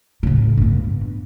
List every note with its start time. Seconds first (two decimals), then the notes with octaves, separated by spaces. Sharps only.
0.23 A2 C#3
0.57 G2 B3